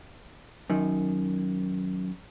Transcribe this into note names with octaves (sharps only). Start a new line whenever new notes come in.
F#2 D#3